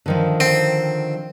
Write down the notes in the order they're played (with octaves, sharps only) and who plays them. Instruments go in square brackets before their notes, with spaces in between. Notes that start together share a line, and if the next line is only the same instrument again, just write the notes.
[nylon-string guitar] D3 D#3 F3
[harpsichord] C4